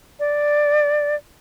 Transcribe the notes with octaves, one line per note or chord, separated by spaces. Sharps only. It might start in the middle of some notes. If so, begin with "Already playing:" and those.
D5